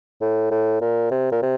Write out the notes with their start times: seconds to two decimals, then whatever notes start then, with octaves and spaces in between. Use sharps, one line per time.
0.21 A2
0.51 A2
0.81 A#2
1.11 C3
1.32 A#2
1.42 C3